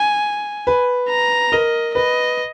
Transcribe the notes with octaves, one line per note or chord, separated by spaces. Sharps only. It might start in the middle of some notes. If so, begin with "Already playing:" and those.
Already playing: G#5
B4
A#5
A#4 D#5
B4 D#5